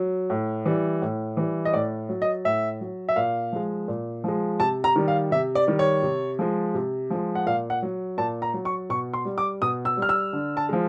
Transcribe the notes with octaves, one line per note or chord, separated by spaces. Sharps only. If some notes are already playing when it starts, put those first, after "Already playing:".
Already playing: F#3
A2
E3 G3
A2
E3 G3
D#5
A2 D5
F#3
D#5
A2 E5
F#3
E5
A#2 F5
F3 G#3
A#2
F3 G#3
C3 A5
A#5
D#3 G3
F5
C3 E5
D5
D#3 G3
C#5
C3
F3 G#3
C3
F3 G#3
F#5
A#2 F5
F#5
F#3
A#2 A5
A#5
F#3
C#6
B2 C#6
C6
G3
D6
B2 D#6
E6
G3
F6
E6
D3
A5
F3 G#3